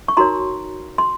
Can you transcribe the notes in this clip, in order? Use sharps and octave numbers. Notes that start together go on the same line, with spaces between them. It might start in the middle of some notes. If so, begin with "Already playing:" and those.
C#6
D#4 F#4 A#4 C#5 A#5 C6
C6